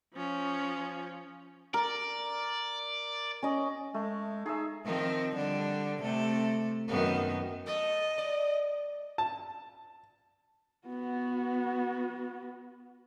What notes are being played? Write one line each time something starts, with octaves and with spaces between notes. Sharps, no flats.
F3 C#4
A#4 D5
C#4 D#5
G#3 A3
D#4 G#4 E5
D#3 F3 C4
D3 G3 D4
C3 A3 A4
F#2 D#3 B3
A3 D#5
D5
A5
B3 F#4